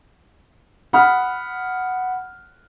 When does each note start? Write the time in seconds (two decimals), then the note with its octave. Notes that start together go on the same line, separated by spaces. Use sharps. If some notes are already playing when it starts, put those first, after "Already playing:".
0.93 F#5 B5 D#6 F6